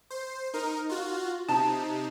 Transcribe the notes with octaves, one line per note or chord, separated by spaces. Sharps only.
C5
D#4 A#4
F4 F#4
C3 D#4 A5